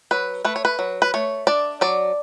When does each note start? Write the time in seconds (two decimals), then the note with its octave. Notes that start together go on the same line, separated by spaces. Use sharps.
0.11 F#3 B4
0.44 A3 B4
0.56 C#5
0.65 B4
0.79 F#3
1.02 B4
1.14 A3 C#5
1.47 D4 D5
1.81 F#3 D5